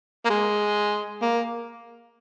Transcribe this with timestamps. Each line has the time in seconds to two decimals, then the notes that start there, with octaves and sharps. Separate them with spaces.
0.25 A#3
0.30 G#3
1.22 A#3